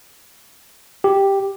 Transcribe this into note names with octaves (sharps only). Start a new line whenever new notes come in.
G4